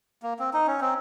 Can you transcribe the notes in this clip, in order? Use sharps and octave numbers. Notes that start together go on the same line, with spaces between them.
A#3
C4
D#4
C#4
C4